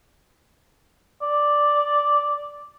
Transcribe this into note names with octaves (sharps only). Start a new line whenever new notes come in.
D5